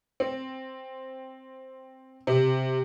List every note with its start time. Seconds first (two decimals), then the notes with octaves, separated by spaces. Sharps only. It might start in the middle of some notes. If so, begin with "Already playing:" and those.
0.20 C4
2.27 C3